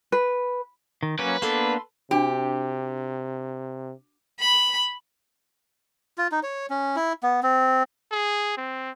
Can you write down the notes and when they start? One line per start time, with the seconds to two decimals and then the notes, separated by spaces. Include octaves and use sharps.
0.12 B4
1.03 D#3
1.19 F#3 A#3 C#4 B4
1.42 A#3 B3 D4 A4 B5 C6
2.11 C3 D4 F#4 G4
4.40 B5
6.18 F4
6.32 D#4
6.43 C#5
6.70 C#4
6.96 E4
7.23 B3
7.43 C4
8.12 G#4
8.58 C4